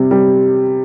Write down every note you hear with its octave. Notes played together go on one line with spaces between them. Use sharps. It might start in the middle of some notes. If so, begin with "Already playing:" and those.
Already playing: C3 G3
G3